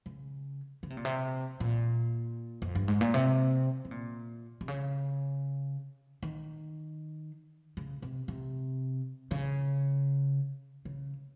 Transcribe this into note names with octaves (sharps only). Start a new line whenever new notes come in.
C#3
C#3
C3
A#2
C3
A#2
F2
G2
G#2
A#2
C3
C3
A#2
C3
C#3
D#3
C#3
C3
C3
C#3
C#3